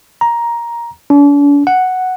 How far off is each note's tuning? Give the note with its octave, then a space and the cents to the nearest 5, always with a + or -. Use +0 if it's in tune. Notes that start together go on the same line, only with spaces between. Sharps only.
A#5 +10
D4 -45
F#5 +0